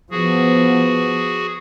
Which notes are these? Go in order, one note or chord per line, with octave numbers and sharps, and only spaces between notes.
F3 B3 F#4 G#4